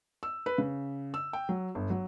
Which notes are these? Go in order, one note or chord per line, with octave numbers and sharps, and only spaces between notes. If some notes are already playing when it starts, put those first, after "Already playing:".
E6
B4
C#3
E6
G5
F#3
G1
F#3